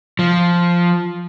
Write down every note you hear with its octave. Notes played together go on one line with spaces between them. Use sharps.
F3